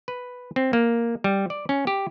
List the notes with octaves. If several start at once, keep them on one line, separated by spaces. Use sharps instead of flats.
B4
C4
A#3
G3
D5
C#4
G4